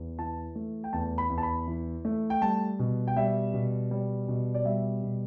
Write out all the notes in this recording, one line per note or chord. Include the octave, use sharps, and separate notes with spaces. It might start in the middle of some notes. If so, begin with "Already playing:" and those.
Already playing: E2
E3 A5
A3
G5
E2 A5
B5
E2
A5
B5
E3
A3
G5
G3 A5
B2
G5
G3 E5
B2
G3
B2
D5
G3 E5
B2